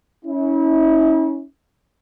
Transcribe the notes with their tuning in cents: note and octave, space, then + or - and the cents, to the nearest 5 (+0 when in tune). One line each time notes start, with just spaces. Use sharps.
C#4 +0 E4 -40